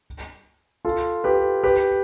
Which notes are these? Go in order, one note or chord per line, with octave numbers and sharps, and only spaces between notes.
F4 A4
G4 B4
G4 B4